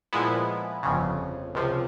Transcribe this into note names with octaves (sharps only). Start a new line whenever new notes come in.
A#2 F3 G#3 B3 E4
G1 F2 C#3
C#2 C3 F3